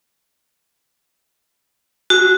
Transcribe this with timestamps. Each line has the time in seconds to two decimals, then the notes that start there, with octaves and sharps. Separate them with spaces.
2.10 F#4